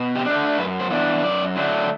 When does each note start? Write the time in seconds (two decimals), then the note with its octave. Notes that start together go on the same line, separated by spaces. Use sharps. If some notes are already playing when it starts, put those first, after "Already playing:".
Already playing: B2
0.15 G4
0.25 D4
0.30 A3
0.36 A4
0.58 F#2 B4
0.80 C5
0.90 E3 B3 D4
1.23 F#2 D5
1.56 D3 F#3 A3 D4